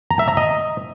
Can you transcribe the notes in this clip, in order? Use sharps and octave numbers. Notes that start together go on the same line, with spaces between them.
A#5
E5
A#5
D#5